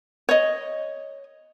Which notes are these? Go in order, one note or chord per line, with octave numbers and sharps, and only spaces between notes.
C#5 D#5